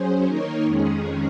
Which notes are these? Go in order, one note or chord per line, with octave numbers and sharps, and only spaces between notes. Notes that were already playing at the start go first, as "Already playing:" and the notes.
Already playing: F#3 C#4 G#4 C5
D#3 A#3 D#4 A#4 C#5
F2 D#3 G#3 C#4 G#4